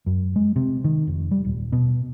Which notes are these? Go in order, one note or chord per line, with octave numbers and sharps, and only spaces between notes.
F#2
G#3
C3
D#3
F1
G3
D#1
B2